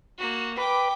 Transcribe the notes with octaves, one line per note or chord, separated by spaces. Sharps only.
A#3 F#4
B4 G5 D6